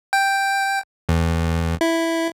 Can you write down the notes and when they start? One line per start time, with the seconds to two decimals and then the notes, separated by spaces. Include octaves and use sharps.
0.13 G5
1.09 E2
1.81 E4